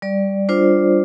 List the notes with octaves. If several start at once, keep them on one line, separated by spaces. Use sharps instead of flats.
G3 D5
D4 F4 C5